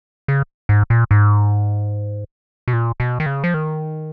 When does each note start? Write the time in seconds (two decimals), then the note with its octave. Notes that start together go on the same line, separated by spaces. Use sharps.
0.28 C#3
0.69 G#2
0.90 A#2
1.11 G#2
2.68 B2
2.73 A#2
3.00 B2
3.20 D#3
3.26 C#3
3.44 F3
3.54 D#3